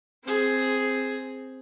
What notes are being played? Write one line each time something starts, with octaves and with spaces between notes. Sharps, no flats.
C4 G#4